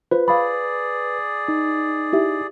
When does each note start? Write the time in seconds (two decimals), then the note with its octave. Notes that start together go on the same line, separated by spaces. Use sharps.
0.11 F4 B4 C5
0.28 G#4 D5 F5 B5
1.48 D#4
2.13 E4 G4 E5